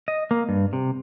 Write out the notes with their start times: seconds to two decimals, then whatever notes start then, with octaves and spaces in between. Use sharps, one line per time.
0.08 D#5
0.31 A#3
0.49 G2
0.73 C3